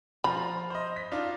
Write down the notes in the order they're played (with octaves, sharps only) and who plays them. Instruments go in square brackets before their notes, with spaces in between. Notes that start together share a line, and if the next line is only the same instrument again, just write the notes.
[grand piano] F3 F4 A#5 [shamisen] B5
[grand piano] C5 D#5
B6
D4 D#4 F4